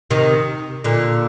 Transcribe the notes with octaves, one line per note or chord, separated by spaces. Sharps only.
C3 D#3
A#2 D3